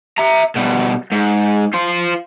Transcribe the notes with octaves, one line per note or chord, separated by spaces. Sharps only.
E5 A#5
B2 G3
G#2
F4 C5